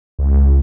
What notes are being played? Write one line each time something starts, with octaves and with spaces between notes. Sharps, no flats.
C#2